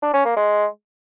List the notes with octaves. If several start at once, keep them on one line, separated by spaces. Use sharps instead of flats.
D4
C#4
A#3
G#3